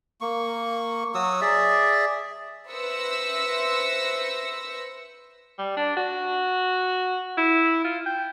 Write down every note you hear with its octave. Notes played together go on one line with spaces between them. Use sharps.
A#3 C#6
F#3 F#4 D#6 E6
G#4 D5 E5
B4 C5 E5 E6 A#6 C#7
G3
D4
F#4
E4
F4
G5